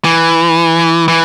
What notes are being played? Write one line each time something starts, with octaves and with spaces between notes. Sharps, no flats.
E3
E3